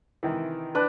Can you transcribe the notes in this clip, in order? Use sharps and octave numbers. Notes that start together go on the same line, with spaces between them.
C3 D#3 E3
D4 B4